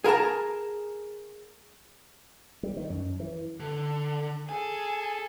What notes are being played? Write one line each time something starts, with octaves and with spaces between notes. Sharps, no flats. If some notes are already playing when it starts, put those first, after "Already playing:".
G#4 A#4 F#5 A5 A#5
G3
D#3
F#2
E3
D3
G#4 A4 G#5